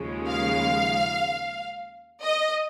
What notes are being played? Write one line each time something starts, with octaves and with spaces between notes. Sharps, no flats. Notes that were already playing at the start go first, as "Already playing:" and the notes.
Already playing: D#2 C#3 F3 G#3
F5
D#5